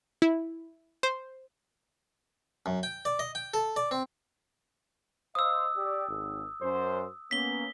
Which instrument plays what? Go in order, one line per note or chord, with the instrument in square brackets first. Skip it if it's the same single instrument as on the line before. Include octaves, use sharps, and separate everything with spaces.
[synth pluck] E4
C5
[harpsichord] F#2
G5
D5
D#5
G5
A4
D5
C4
[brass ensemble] C5 D#5 F5 [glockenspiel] D#6 E6
[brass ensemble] G4 D5
G#1
F#2 C5
[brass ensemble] A#3 B3 C#4 [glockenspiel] B6 G7